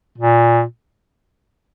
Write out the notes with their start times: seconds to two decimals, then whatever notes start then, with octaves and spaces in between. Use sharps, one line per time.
0.18 A#2